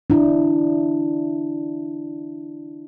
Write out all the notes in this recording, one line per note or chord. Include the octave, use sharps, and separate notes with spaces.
D4 E4